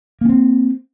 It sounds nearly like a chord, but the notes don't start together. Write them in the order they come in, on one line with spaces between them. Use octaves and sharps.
A#3 C#4 C4